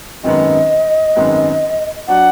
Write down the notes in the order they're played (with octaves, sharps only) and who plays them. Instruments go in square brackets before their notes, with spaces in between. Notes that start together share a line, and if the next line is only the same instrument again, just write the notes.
[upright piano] G#1 F#2 D#3 G#3 B3 [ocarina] D#5
[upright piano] G#1 F#2 D#3 G#3 B3
[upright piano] F#3 D4 F#4 [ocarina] F#5